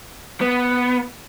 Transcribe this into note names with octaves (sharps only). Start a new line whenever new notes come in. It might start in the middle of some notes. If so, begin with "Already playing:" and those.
B3